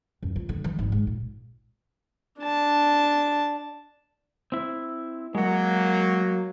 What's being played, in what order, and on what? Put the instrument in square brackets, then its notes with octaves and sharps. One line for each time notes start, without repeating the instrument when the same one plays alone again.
[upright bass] F#2
F4
D3
E3
G#1
G#2
A#2
[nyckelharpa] D4 A5
[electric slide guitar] C4 E4
[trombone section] F#3 A#3 [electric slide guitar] G#3 F#5